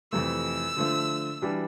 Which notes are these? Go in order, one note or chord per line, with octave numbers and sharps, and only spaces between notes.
F2 C3 E3 A3 E6
D3 F3 A3
E3 G3 D4